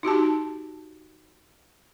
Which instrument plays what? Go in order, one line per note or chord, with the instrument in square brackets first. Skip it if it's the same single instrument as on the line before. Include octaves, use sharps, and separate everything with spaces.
[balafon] D#4 F#4 G4 A5